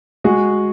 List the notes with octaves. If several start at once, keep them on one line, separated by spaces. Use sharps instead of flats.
G#3 F#4 G#4